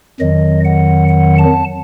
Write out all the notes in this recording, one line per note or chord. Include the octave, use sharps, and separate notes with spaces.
F2 D#3 F#3 D#5
F#5
F#5
A5